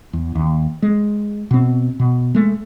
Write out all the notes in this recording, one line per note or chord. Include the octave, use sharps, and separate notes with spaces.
E2
D#2
G#3
B2 C4
B2
G#3 A3